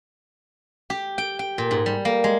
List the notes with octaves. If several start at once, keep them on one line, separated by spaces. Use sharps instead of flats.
G4
G5
G5
A#2
G#2
G3
A#3
G#3